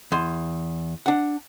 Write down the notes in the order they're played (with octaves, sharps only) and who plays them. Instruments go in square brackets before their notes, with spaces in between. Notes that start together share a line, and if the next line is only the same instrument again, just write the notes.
[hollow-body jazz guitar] E2 C6
D4 F#5